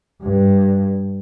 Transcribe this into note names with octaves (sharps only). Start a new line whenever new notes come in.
G2